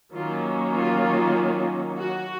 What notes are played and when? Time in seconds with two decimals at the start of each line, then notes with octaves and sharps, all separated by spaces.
0.14 D#3 F#3 A#3 C#4 F4
0.76 F4
1.98 F#4